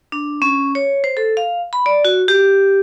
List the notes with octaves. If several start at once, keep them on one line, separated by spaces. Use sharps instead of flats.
D4
C#4
C#5
C5
A4
F5
B5
D5
F#4
G4